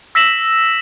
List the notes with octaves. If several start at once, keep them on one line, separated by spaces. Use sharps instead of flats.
E6 A#6 B6 E7 F#7